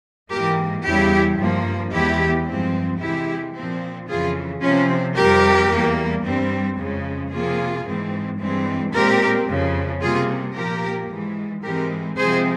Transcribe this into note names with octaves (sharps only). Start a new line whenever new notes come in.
G#2 E3 A#3 G4 A#4
E2 C#3 G3 E4 G4
G2 F3 A#3
E2 E3 G#3 E4 G4
G2 F3 G#3 C4
C3 E3 G#3 E4 G4
A#2 F3 C4
F2 C#3 E3 F4 G#4
C3 F3 C4 C#4 F4
F2 C3 G3 G4 A#4
E2 E3 G3 A#3
G2 G3 C4
F2 C#3 F3 G#3
C3 F3 A#3 F4 G#4
G#2 E3 G#3 C4
G2 E3 G#3 C4
A#2 G#3 C4 G4 A#4
F2 C#3 F3
C3 G3 A#3 F4 G#4
A#2 F3 A#3 G4 A#4
G#2 E3 G#3
G#2 E3 G#3 C4 G4 A#4
C3 F3 G#3 C4 G#4 C5